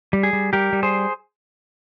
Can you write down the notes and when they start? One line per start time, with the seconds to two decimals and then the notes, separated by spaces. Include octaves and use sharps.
0.13 G3
0.23 G#4
0.33 G3
0.53 G3 G4 A#4
0.73 G3
0.83 G#4 C5